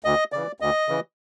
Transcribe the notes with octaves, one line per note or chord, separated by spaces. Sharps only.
D2 D#5
C#3 E3 D5
D2 D#5
C#3 E3